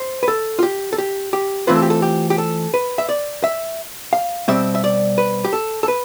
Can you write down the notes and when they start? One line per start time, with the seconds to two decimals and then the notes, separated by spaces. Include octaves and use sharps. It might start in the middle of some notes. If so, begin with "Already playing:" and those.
Already playing: C5
0.23 B4
0.28 A4
0.59 F4
0.63 G4
0.93 A4
0.98 G4
1.33 G4
1.67 E3 A3 C4 F4 B4
1.76 A4
1.82 G4
1.90 A4
2.02 G4
2.30 G4
2.38 A4
2.74 B4
2.98 E5
3.09 D5
3.44 E5
4.13 F5
4.48 B2 G3 C4 E5
4.75 E5
4.84 D5
5.18 B4
5.45 G4
5.53 A4
5.83 A4
5.88 B4